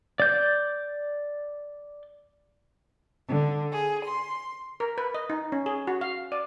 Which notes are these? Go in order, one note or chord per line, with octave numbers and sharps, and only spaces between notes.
D5 G6
D3
G#4
C6
A#4
B4
D#5
D#4
C#4
G#4
F#4
F5
D5